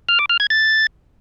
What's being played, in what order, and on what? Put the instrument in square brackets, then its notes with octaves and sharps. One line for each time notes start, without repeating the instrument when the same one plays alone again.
[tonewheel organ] F6
D6
F6
G#6
A6